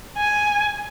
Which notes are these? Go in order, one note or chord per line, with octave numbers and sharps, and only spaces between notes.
G#5